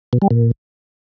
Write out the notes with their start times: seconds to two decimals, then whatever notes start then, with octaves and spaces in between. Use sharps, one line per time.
0.13 B2
0.22 G3
0.31 A#2